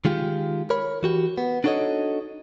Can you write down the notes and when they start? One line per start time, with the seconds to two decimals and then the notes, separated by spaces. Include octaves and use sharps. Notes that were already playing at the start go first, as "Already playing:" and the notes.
0.05 D#3 G#3 F4 G4
0.70 A#4 C#5 B5
1.03 E3 F#4 G4
1.38 B3
1.64 D4 D#4 F#4 A4 C#5 D#5